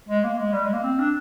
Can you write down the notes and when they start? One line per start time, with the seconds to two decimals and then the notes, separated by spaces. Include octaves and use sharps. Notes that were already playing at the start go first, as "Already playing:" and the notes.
0.09 G#3
0.24 A#3
0.38 G#3
0.53 G3
0.63 G#3
0.73 A#3
0.83 C4
0.99 D4